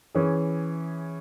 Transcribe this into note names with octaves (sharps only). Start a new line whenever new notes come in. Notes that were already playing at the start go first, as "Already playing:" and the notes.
E3 C#4 G#4